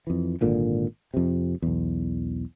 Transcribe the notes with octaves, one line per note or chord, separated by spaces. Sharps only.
F2 E3
G#1 A#2 D3
F2 C3
B1 E2